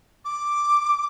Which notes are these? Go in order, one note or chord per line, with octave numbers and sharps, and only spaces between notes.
D6